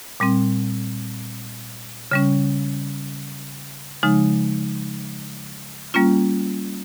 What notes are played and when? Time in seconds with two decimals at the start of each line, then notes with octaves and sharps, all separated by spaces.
0.20 A#2 G3 C4
2.11 C#3 G3 C#4
4.03 C#3 F3 G#3 D#4
5.94 G3 A#3 C#4 F4